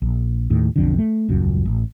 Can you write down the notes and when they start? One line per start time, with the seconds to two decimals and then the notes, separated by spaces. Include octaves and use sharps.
0.02 A#1
0.50 D#2 A2
0.76 B1 F2 D3
0.98 A3
1.29 D#1 C#2 F#2
1.65 A1